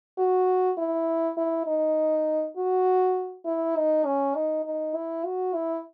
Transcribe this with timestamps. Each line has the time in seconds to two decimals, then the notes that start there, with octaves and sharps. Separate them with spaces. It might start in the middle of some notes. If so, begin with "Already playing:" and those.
0.18 F#4
0.78 E4
1.38 E4
1.67 D#4
2.57 F#4
3.46 E4
3.76 D#4
4.05 C#4
4.35 D#4
4.65 D#4
4.95 E4
5.25 F#4
5.55 E4